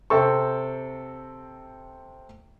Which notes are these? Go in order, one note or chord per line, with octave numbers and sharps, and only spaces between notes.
C3 C4 A4 C#6